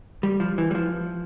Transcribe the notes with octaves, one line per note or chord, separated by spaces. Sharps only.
G3
F3
E3
G3
F3